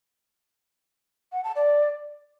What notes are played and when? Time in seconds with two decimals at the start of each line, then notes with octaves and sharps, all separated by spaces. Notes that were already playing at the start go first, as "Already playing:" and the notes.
1.32 F#5
1.44 A5
1.56 D5